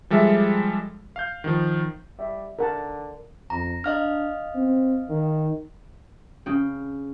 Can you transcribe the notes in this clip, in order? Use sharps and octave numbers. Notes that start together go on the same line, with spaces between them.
F3 G3 G#3 A4 E5
F5 G6
D#3 F3
G3 E5
D3 A#4 F#5 A5
F2 A#5
D4 D#5 F5 F6
C4
D#3
C#3 G5